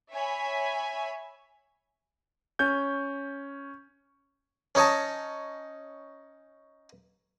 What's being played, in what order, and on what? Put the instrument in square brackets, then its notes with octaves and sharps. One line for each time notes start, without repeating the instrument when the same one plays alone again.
[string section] C#5 E5 G#5 B5
[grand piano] C#4 G6
[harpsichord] C#4 D#4 C#5 D#5 A5